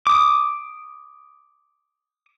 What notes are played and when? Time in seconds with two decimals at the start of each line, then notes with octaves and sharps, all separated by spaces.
0.07 D6 D#6